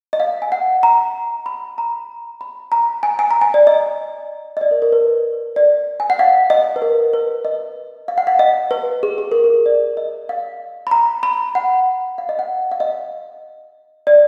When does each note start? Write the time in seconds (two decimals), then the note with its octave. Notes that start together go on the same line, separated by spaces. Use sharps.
0.13 D#5
0.20 F5
0.42 G#5
0.52 F#5
0.83 A#5
1.46 B5
1.78 A#5
2.41 B5
2.72 A#5
3.03 G#5
3.19 G#5
3.31 A#5
3.41 G#5
3.54 D5
3.67 D#5
4.57 D#5
4.61 D5
4.71 A#4
4.82 A#4
4.92 B4
5.56 D5
6.00 G#5
6.10 F#5
6.19 F5
6.50 D#5
6.76 B4
6.82 A#4
7.13 B4
7.45 D#5
8.08 F5
8.18 F#5
8.27 F5
8.39 D#5
8.71 B4
9.03 G#4
9.18 G#4
9.32 A#4
9.44 G#4
9.66 D5
9.97 D#5
10.29 F5
10.87 B5
10.91 A#5
11.23 B5
11.55 F#5
12.18 F5
12.29 D#5
12.39 F#5
12.72 F5
12.80 D#5
14.07 D5